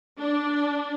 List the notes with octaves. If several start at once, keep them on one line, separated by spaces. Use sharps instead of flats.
D4